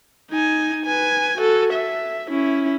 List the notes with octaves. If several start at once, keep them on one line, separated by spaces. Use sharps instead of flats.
D#4 G#5
B4 G#5
F#4 A4
E5
C#4 E4